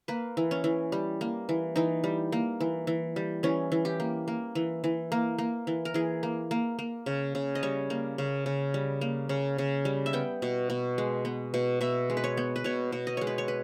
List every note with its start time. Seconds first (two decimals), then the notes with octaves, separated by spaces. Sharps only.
0.08 A#3 B4
0.37 E3
0.51 C#4
0.64 E3
0.92 G3
1.21 A#3
1.49 E3
1.76 E3 D#4
2.04 G3
2.32 A#3
2.60 E3
2.87 E3
3.16 G3
3.43 E3 C#4
3.72 E3
3.85 G4
4.00 A#3
4.28 A#3
4.55 E3
4.84 E3
5.12 A#3
5.38 A#3
5.67 E3
5.85 A#4
5.94 E3 G#4
6.23 A#3
6.51 A#3
6.79 A#3
7.06 C#3
7.35 C#3
7.55 D#5
7.63 G3 C#5
7.90 A#3
8.18 C#3
8.46 C#3
8.74 G3
9.01 A#3
9.29 C#3
9.58 C#3
9.85 G3
10.06 E5
10.13 B3 G5
10.42 B2
10.70 B2
10.98 G#3
11.25 B3
11.54 B2
11.81 B2 E5
12.10 G#3
12.17 B4
12.24 C#5
12.37 B3
12.56 B4
12.64 B2 C#5
12.92 B2
13.07 D#5
13.17 G#3 C#5
13.27 B4
13.38 C#5
13.48 B4